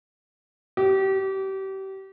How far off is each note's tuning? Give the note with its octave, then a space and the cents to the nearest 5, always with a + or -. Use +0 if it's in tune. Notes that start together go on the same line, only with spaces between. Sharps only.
G4 -30